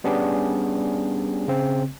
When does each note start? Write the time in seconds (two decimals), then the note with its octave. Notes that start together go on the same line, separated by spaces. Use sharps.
0.04 G3 B3 C#4 D4 G4 G#4
1.48 C#3 C4